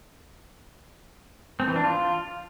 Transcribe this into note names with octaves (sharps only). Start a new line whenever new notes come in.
C4
E3
D4
F4